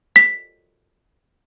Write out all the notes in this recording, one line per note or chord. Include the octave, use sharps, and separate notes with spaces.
B6